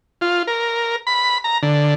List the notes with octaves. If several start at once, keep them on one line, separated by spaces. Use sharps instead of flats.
F4
A#4
B5
A#5
D3